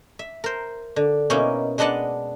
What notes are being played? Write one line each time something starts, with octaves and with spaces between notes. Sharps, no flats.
E5
A#4 C5
D3
B2 A#3 C#4 D#4 E4
G#3 B3 D4 D#5 F#5 A5